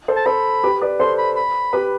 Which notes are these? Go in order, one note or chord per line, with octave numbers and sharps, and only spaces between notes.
A4 C5
A5
A4 C5 B5
G4 B4
B4 D5
A4 C5 C6
B5
B5
G4 B4